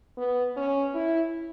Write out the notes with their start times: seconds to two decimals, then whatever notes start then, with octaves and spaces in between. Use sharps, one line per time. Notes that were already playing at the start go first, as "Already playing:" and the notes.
0.17 B3
0.56 C#4
0.95 E4